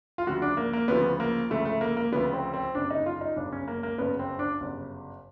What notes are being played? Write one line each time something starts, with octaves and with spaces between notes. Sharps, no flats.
F4
D2 C#3 F3 F#4
D4
A#3
A#3
D2 C#3 F3 B3
A#3
D2 C#3 F3 A3
A3
A#3
A#3
D2 C#3 F3 B3
C4
C4
G1 F#2 C#3 D4
D#4
F4
D#4
G1 F#2 C#3 D4
C#4
A#3
A#3
G1 F#2 C#3 B3
C4
D4
G1 F#2 C#3